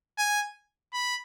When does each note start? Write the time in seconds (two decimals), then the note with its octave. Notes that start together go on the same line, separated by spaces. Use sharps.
0.18 G#5
0.93 B5